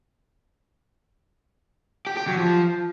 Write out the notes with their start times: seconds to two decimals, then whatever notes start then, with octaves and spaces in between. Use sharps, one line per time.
2.07 G4
2.17 G4
2.27 F#3
2.38 F3